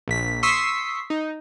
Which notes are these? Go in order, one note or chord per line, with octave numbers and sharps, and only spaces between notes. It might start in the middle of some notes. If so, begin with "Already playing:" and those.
A#1 B6
C6 C#6 D#6 E6 B6 C7
D#4